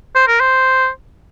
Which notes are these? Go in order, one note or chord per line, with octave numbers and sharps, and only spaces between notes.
C5
A#4
C5